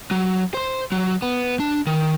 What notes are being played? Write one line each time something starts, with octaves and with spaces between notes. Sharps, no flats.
F#3
C5 C6
F#3
B3
D4
D#3